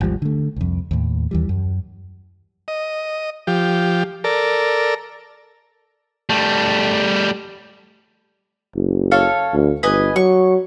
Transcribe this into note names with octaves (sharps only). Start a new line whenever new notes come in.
G#1 D#2 F3 G3
D3 A3
C2 F2
D#2 A2
D#2 E3 G3
F#2
D#5
F3 G4
A4 A#4 D5
G3 A3
F#1
A4 C#5 F5
D2
G1 B4 D#5 G#5
F#3 C#6